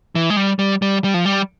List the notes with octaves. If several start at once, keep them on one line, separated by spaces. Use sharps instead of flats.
E3
G#3
G3
G3
G3
G3
F3
G3